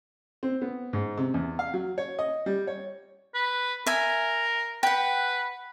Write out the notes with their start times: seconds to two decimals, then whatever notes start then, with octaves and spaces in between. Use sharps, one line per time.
0.43 C4
0.62 B3
0.93 G#2
1.18 C3
1.34 E2
1.59 F5
1.74 F#3
1.98 C#5
2.19 D#5
2.46 G3
2.67 C#5
3.34 B4
3.86 A#4 E5 G#5
4.83 B4 F#5 G5